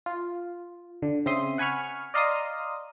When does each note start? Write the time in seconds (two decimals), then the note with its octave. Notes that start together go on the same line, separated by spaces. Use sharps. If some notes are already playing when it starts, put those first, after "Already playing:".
0.06 F4
1.02 D3
1.26 C#3 C4 E5 C6 D#6
1.58 F#5 G#5 B5 C#6 F6
2.14 D5 D#5 F5 A#5 C6 D#6